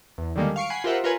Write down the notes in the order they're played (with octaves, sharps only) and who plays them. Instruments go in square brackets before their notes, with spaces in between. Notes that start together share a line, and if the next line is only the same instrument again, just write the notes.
[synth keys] E2
D3 D#3 G3 G#3 A#3
F5 C#6 C7 D7
F#5 G#5 B5 C7
F4 G4 A#4 C5 E5 F#5
F4 A#4 B4 C#5 G#5